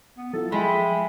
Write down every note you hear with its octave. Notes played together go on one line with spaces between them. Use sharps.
B3
F#3 E4 F4 A4
F3 G#3 E5 G5 G#5 B5 C6